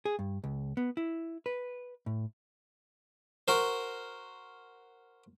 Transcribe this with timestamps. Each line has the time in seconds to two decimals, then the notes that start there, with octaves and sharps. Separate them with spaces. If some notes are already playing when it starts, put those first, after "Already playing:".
0.05 G#4
0.19 G2
0.44 C#2
0.77 B3
0.97 E4
1.46 B4
2.06 A2
3.48 F#4 A#4 C5